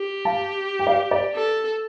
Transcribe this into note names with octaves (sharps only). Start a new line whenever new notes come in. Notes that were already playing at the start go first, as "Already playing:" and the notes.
Already playing: G4
F5 A5
G5
D5 F5
D5
A4